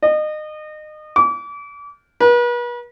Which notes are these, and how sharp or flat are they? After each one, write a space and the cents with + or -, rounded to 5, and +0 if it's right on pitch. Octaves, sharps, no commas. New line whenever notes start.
D#5 -30
D6 -35
B4 -40